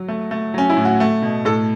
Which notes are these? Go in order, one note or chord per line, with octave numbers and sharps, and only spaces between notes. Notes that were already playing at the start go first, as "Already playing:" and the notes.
Already playing: F#3
A3
A3
F#3 C#4
E4
A2
F#4
A3
B2
A2 A4